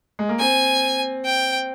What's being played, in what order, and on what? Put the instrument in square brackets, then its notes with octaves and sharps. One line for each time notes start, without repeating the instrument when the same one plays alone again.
[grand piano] G#3
A#3
[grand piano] C4 [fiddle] G#5
[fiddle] G5